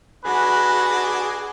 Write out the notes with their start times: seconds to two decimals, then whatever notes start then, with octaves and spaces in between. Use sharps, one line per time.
0.25 D4 F#4 G#4 B4 D#5